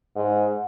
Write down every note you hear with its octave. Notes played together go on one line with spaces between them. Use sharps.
G#2